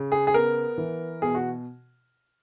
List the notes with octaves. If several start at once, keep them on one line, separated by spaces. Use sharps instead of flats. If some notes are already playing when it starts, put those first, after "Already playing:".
Already playing: C#3
G#4
G#4
B3 A#4
E3
B2 G#4
F#4